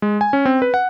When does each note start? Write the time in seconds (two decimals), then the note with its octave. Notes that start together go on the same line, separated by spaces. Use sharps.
0.02 G#3
0.21 G#5
0.33 C#4
0.45 C4
0.62 B4
0.74 F#5